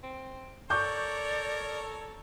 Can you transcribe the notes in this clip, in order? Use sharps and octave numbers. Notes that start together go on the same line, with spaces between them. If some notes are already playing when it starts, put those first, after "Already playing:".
C4
A4 A#4 C#5 D5 C#6 D6 G6